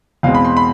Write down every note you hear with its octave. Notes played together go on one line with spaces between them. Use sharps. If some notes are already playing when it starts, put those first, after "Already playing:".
E2 B2 G#3 C4 F5
B5
C6
B5